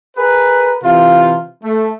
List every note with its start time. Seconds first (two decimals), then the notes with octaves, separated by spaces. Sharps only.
0.16 G#4 A#4 B4
0.83 C3 E3 F4
1.63 A3